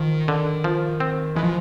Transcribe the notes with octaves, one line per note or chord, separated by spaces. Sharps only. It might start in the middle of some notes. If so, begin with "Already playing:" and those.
Already playing: D#3 F3
D3
F3
C4
E3 G#3
F3